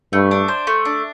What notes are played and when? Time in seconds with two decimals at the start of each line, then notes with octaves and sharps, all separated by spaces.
0.13 G2 A3
0.31 D4
0.48 C5
0.67 A3
0.85 D4